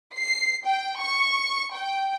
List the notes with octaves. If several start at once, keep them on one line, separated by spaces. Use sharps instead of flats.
C7
G5
C#6
G5